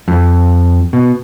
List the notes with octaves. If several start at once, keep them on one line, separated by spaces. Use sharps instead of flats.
F2
B2